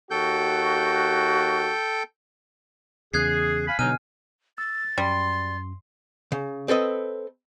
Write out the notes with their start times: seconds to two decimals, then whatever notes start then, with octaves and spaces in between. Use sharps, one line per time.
0.11 D#2 F#4 A4 G5 G6
3.14 E2 C#3 G#4 F#6 G#6 C7
3.67 F5 G#5 B5
3.79 B2 D3 F#3 D#4 G#5 F6 D#7
4.58 E6 A6
4.98 F#2 G3 C6
6.32 C#3
6.68 C4 A4 B4 D#5